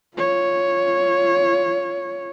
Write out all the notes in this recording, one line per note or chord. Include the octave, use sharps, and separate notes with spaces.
F4 C#5